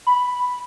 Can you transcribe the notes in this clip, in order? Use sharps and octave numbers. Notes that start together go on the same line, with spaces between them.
B5